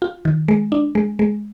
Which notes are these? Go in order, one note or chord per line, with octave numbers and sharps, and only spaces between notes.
F4
D#3
G#3
D4
G#3
G#3